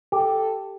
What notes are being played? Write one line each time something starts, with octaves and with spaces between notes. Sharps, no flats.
G4 A4